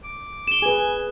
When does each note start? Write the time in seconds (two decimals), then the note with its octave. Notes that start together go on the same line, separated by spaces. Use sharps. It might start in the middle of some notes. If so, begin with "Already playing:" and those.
0.04 D6
0.47 E7 G7
0.62 G#4 B4 G#5